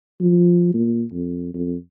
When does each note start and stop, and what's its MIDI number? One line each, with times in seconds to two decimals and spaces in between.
0.21 0.72 53
0.74 1.03 46
1.13 1.53 41
1.54 1.75 41